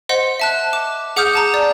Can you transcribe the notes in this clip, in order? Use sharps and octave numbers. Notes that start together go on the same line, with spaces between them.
C5 D#5 F#5 C6
E5 A5 F#6
D6 E7
G#4 F#5 D6 D#6 F6 G6
F#5 A5 A#5
D5